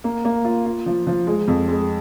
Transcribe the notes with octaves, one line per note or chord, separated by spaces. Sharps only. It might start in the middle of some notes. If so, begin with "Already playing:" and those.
A#3
A#3
F4
F4
F3
F3
G#3
F2
G#3